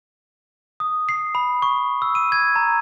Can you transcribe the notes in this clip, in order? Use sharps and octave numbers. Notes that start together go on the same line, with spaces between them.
D#6
C7
B5
C#6
E6
D#7
G#6
A#5